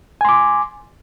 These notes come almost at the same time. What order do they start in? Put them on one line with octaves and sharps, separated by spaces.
G#5 C6 D6